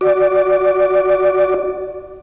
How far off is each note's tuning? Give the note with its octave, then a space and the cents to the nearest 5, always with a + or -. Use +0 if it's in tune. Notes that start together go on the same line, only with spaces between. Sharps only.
F#4 +0 D5 +0